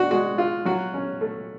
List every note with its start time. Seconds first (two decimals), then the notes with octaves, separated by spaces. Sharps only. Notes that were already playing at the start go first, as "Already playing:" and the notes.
Already playing: D4 F#4
0.11 G#3 F#4
0.38 F4
0.65 F#3 F#4
0.94 C#4
1.21 A3